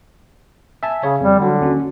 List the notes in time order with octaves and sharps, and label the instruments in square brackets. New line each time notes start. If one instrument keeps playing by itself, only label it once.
[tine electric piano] E5 G#5 A5
[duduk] C#3 [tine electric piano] C#5
[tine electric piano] F2 [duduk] G3
[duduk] D3 [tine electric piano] F#3 G3
[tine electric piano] D#2 C#4 F#4